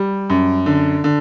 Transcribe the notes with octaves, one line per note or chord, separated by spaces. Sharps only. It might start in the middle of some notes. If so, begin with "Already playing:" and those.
Already playing: G3
F#2
D3
D3